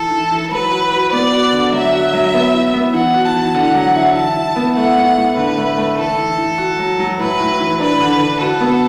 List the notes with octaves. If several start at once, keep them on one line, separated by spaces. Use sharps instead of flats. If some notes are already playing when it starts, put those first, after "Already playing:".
Already playing: E3 A4
E3
E3
F#3 B4
F#4
F#4
B3 D5
F#4
D3
F#3 E5
F#4
F#3
B3
E4
B3
E3 F#5
F#4
A5
E3
D3 F#5
F#3
E4
E3 A5
E4
B3
A3 F#5
A2
A2
D3 B4
A3
A3
E3 A4
E3
E3
F#4
F#3
F#3
A2 B4
A2
E3
D4 B4
D3
D3
F#4 A4
B3